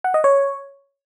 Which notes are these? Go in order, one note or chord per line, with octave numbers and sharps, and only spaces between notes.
F#5
D#5
C#5